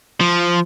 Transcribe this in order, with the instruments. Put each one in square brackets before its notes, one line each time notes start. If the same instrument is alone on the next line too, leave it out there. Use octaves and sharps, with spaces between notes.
[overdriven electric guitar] F3